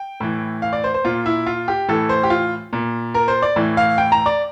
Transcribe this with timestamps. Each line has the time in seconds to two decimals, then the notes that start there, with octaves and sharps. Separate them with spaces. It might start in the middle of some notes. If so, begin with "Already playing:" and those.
Already playing: G5
0.20 A2 E3
0.62 F5
0.73 D5
0.84 C5
0.94 C5
1.04 A#2 F4
1.26 E4
1.46 F4
1.68 G4
1.88 A2 E3 A4
2.09 C5
2.23 G4
2.30 F4
2.73 A#2
3.14 A#4
3.28 C5
3.42 D5
3.56 A2 E3
3.77 F5
3.98 G5
4.12 A#5
4.26 D5